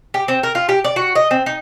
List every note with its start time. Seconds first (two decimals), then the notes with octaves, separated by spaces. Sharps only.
0.14 G4
0.28 C4
0.43 A#4
0.55 F4
0.69 G4
0.84 D5
0.96 F#4
1.15 D#5
1.31 C4
1.46 D#4